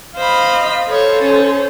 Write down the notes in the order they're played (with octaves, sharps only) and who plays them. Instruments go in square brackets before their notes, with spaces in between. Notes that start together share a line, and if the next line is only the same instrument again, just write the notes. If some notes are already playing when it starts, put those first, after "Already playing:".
[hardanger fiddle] C5 B5 [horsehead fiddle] D#5 F5
[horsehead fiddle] A4 C5 [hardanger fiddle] C#5
[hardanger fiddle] C#4